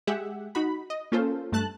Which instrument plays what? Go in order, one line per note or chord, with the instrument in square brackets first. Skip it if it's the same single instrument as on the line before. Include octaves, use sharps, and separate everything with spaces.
[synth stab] G#3 G4 G#4 E5 F#5
D#4 F#4 B5
D#5
A#3 C#4 F4 A4 C5
G2 A3 A5 F#6